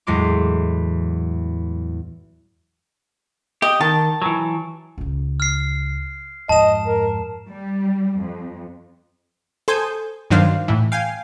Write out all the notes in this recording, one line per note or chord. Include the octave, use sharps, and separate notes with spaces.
E2 A2 F#3 G#3 C6 D6
G4 D#5
D#3 A5
E3 F#3
C#2 C#3
F6 C7
F2 G#2 D#5 A5 E7
A#4
G3
F2
A4 C5 G#5 D#6 G6
G2 D#3 F#3 D4 C5 F5
A2 E3
F5 G5 G#5